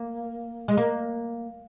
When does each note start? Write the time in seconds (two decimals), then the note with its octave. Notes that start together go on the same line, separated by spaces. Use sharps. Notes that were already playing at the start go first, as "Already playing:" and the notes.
Already playing: A#3
0.68 G#3
0.77 A#3